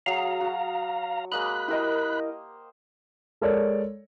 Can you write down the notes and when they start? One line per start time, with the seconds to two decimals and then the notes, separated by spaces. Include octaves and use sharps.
0.06 F#3 G#4 F5 A#5
0.41 F#4 A5
1.32 G#3 A#3 D#5 B5 F#6
1.68 E4 G4 A#4 C5 D#5
3.41 G#3 A4 A#4 C#5 D5